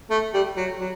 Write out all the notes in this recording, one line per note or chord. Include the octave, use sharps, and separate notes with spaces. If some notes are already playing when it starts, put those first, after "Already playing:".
A3
G3
F#3
F#3